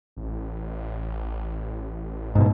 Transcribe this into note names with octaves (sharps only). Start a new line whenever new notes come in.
A1
G#2 B2